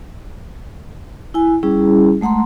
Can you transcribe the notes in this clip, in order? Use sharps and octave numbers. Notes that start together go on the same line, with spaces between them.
E4 G#5
G3 C#4 E4 G#4
G#3 A3 F#5 A#5 C6